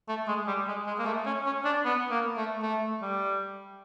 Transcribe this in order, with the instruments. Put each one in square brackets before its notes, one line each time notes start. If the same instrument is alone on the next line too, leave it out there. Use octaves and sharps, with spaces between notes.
[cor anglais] A3
G#3
G3
G#3
G#3
A#3
A3
C#4
C#4
D4
B3
A#3
A3
A3
G3